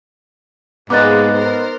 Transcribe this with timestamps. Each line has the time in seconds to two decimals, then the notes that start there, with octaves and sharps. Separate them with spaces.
0.90 G#2 G#3 A#3 B3 D#4 D6 F#6 A6
1.33 A#4 C5